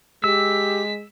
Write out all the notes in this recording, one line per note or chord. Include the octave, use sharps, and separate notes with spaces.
G#3 G4 E6 B6